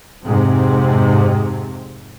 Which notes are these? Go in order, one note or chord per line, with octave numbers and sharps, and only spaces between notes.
F2 G#2 C3 C4